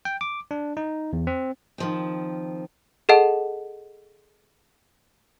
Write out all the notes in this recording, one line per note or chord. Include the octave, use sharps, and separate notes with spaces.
G5
D6
D4
D#4
E2
C4
D#3 F3 C4
G#4 A4 D#5 F#5 A5